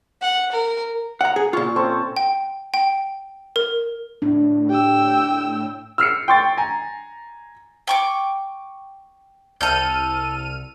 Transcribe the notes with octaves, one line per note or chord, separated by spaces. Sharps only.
F#5
A#4
F#5 A#5
G#4
A#2 F4 C#6
C4 C#4 A4
G5
G5
A#4
A2 D4
G4 G5 E6
E6 F6 C7 C#7
G5 C6 C#6 A6
G#5 A#5
G5 C#6 D6
C2 A4 F6 G6 D#7